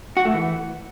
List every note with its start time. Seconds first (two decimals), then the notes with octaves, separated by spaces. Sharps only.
0.17 F#4
0.25 A3
0.34 E3